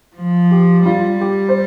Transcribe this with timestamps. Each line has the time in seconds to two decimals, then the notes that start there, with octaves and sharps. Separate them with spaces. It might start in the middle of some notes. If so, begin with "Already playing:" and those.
0.16 F3
0.51 G4
0.85 G3 F4
1.21 G4
1.49 C5